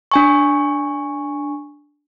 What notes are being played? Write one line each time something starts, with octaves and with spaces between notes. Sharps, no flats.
D4 G#5 C#6